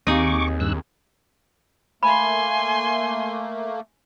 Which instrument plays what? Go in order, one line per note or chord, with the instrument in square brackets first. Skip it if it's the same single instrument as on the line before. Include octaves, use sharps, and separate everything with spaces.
[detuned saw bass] D#2 [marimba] C4 G4 F5 [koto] D#4 G#4 [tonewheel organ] C#6 D6
[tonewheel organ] G2 E6 F#6
[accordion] A3 A#3 [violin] G#5 C6 [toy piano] B5